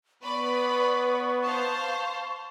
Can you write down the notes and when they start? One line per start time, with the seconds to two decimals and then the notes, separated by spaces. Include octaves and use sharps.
0.23 B3 B4 D5 B5 C#6
1.44 C5 F5 A5